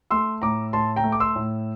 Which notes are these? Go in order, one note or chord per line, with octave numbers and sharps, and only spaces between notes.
A3 C6 E6
A2 A#5 D6
A2 A5 C6
G5 A#5
A3
D6
C6 E6
A2